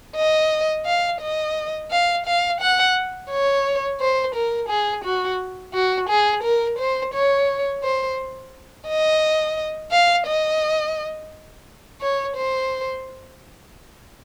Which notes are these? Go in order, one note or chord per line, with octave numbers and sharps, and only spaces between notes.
D#5
F5
D#5
F5
F5
F#5
C#5
C5
A#4
G#4
F#4
F#4
G#4
A#4
C5
C#5
C5
D#5
F5
D#5
C#5
C5